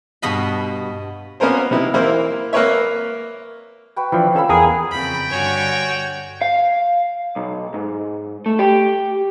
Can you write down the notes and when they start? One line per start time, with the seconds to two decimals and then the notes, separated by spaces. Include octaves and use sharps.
0.22 G2 B2 B3 D#5 F5 B5
1.40 A#3 B3 C#4 A#4 C5
1.71 C3 B3 D#4 E4
1.94 E3 A#3 E4 A#4 C5
2.53 A#3 A#4 B4 C#5 E5
3.96 F#4 B4 G5
4.12 E3 F3 D4 B5
4.35 C#4 F4 A4 E5 F5 B5
4.49 E2 G#4 A#4 B4
4.91 F2 C#3 G5 B5
5.30 G2 D3 F#4 C#5 G#5
6.42 F5
7.36 B1
7.74 G#2
8.46 A3
8.59 G4